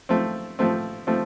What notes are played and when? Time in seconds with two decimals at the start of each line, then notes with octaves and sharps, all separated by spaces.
0.09 F3 A3 C4
0.59 F3 A3 C4
1.07 F3 A3 C4